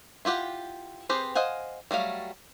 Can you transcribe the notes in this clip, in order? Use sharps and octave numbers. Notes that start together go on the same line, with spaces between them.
E4 F4 G4 F#5
C4 G4 G#4 B4 C5
C5 D#5 F5 F#5 G#5
F#3 G3 A3 F5